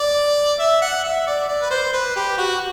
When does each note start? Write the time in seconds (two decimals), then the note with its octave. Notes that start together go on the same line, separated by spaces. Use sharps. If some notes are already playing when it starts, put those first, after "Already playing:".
Already playing: D5
0.59 E5
0.82 F#5
1.04 E5
1.27 D5
1.48 D5
1.62 B4
1.70 C5
1.93 B4
2.16 G4
2.38 F#4